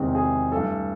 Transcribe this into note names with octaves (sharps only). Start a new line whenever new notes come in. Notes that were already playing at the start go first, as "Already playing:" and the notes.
Already playing: E2 C3 D#3 G#3 C4
G#4
G2 E3 A3 A4